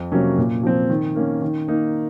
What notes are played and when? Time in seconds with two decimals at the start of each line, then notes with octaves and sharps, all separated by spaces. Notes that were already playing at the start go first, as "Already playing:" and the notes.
Already playing: F2
0.12 C3 F#3 A#3 C#4
0.38 A#2
0.63 F3 C4
0.90 D#3
1.16 A#3 C#4
1.41 D#3
1.68 A#3 D#4